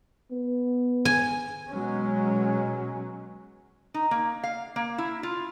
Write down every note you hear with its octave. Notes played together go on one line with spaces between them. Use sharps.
B3
G#5
B2 F#3 G#3 C#4
D#4
A#3
F5
A#3
E4
F4